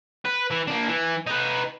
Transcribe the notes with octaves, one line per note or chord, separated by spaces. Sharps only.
B4
E3
A#3 D4
E3
D#4 B4